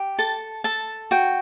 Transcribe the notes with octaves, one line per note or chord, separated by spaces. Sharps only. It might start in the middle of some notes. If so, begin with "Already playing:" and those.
Already playing: G4
A4 A5
A4 A5
F#4 G5